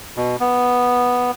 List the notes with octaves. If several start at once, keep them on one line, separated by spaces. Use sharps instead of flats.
B2
B3